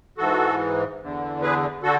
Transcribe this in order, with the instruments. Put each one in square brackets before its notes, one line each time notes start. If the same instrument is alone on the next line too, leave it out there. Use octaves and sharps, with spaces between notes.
[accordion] G#2 E3 F#4 A4
E2 D3
G#4 B4
D3 F#4 A4